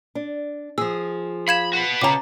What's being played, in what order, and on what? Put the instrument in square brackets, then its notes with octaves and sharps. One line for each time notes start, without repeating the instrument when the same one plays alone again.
[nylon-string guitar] D4
[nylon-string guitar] F3 G#4 [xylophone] E6
[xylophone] F5 G#6 E7 [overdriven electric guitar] B5
[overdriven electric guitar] F#4 B4
[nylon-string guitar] C#3 F#5 A5 [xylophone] A#5 D6